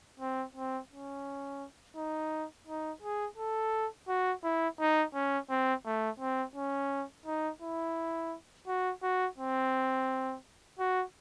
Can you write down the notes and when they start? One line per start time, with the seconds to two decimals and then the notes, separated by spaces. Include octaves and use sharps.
0.20 C4
0.55 C4
0.91 C#4
1.96 D#4
2.67 D#4
3.02 G#4
3.38 A4
4.08 F#4
4.44 E4
4.79 D#4
5.14 C#4
5.50 C4
5.85 A3
6.20 C4
6.56 C#4
7.26 D#4
7.62 E4
8.67 F#4
9.03 F#4
9.38 C4
10.79 F#4